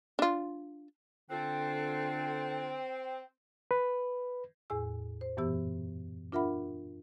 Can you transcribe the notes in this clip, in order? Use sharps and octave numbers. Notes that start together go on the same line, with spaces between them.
D4 F4
D3 C4 F4 A4 G5 F#6
B4
E2 A2 G#4 G#5 E6
C5
F#2 A#2 E3 B3 G4 E6
D4 F4 A#4 E5 F#5 B5